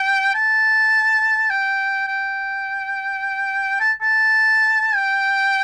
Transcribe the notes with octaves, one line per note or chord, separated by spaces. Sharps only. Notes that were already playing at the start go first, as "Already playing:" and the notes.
Already playing: G5
A5
G5
G5
A5
A5
G5